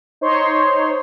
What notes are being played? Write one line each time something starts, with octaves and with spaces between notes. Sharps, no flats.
D#4 C5 C#5 C6